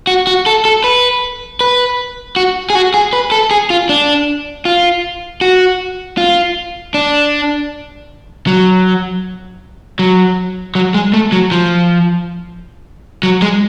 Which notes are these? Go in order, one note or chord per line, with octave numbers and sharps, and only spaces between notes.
F#4
F#4
A4
A4
B4
B4
F#4
G#4
F#4
G#4
B4
A4
G#4
F4
D4
F4
F#4
F4
D4
F#3
F#3
F#3
G#3
A3
F#3
F3
F#3
G#3